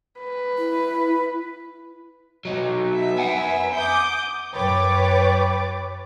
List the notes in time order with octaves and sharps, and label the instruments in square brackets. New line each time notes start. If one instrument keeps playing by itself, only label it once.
[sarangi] B4
[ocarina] E4
[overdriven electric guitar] F#3 D#4
[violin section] B3 E5
[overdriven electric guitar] F#5 G#5
[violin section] D6 D#6 G6
[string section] F#2 B4 C#5 G5 D6 A6